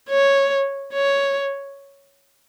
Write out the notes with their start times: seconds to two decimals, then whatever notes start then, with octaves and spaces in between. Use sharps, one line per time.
0.09 C#5
0.93 C#5